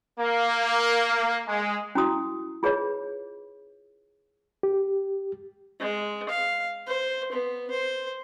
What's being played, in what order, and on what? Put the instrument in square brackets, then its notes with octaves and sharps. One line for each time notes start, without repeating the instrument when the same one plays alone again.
[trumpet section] A#3
G#3
[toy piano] C#4 E4 F#4 D#6
F4 G#4 B4 C#5 D#5
[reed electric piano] G4
[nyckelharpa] G#3
F5
C5
B3
C5